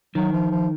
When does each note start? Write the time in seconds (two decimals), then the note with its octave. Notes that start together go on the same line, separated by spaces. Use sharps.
0.15 D#3 F#3
0.33 F3
0.52 F3